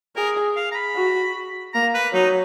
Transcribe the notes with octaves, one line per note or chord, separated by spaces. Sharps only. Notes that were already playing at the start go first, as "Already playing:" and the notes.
G#4 A#4
F5
A#5
B5
F#4
A#3 A#5
B4
F#3 D#4